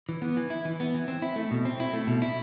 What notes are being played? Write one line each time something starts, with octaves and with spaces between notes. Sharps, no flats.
E3
B3
E3
E4
E3
B3
E3
C4
E4
A3
B2
C4
E4
A3
B2
E4